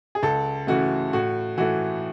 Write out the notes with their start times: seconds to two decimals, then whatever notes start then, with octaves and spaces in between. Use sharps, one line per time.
0.15 G#4
0.23 C#2 A4
0.67 C#3 E3 A3 F#4
1.13 A2 F#4
1.58 E3 A3 F#4